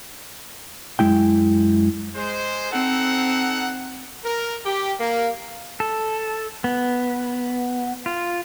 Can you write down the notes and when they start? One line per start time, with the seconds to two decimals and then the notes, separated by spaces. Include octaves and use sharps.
0.99 F#2 G#3 E4 G5
2.15 G#3 C5
2.72 C4 D#4 A4 F#5
4.24 A#4
4.66 G4
5.00 A#3
5.80 A4
6.64 B3
8.06 F4